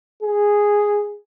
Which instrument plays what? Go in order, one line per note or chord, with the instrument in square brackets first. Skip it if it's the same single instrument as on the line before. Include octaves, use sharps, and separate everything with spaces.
[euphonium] G#4